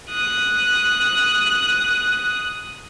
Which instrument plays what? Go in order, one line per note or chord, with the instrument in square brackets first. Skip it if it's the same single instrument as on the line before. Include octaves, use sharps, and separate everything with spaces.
[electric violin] D#6 F#6